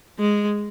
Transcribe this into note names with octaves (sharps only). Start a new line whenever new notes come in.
G#3